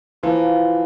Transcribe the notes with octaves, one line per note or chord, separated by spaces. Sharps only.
E3 F3 A#3 F4